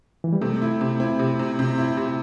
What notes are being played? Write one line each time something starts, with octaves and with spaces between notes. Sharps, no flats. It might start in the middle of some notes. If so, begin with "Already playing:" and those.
E3
G3
C3 A3
E4
C3
C4 E4
C3
C3
C3
E4
C3